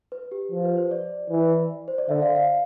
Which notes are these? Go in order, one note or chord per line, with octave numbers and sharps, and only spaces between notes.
B4
G4
F3
B4
C5
D5
E3
C5
D5
D3 E5
F5
F5